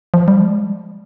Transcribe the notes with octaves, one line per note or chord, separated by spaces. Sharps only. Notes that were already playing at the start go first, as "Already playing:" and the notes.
F3
G3
G#3